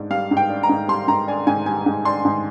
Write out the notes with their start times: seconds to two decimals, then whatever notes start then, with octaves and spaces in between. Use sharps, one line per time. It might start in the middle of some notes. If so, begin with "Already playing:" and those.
Already playing: G#2 D4
0.10 G3 F5
0.31 G#2
0.37 G5
0.49 D4
0.63 A#5
0.69 G#2
0.88 G3 C6
1.08 G#2 A#5
1.27 D4 G#5
1.47 G#2 G#5
1.66 G3 G#5
1.86 G#2
2.05 D4 C6
2.25 G#2